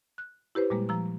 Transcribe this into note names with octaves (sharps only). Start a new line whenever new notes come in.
F#6
E4 G4 B4 C5
A#2 G3 G#3 A#3
F3 A#5 E6